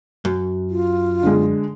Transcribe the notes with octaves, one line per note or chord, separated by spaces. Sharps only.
F#2
F4
D3 G#3